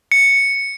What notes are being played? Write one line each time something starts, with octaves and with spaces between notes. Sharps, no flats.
C#7